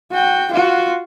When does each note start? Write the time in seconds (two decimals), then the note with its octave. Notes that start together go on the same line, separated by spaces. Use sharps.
0.11 F#4 G5
0.51 F4 F#4